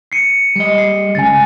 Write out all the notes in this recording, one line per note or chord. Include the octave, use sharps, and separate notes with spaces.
C7 C#7 D#7
G3 D#5
C7
C#2 C#3 G#5 A6